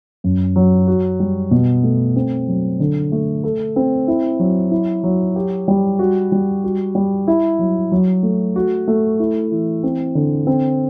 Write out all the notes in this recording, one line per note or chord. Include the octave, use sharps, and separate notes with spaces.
F#2
F#3
F#4
G3
B2
A3
C4
F#3
D3
A3
A4
C4
E4
F#3
E4
F#3
G4
G3
F#4
G3
F#4
G3
E4
F#3
F#3
A3
F#4
A3
E4
E3
C4
D3
C4